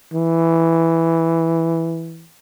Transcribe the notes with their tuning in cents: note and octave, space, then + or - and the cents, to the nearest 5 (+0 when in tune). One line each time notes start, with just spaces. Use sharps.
E3 +0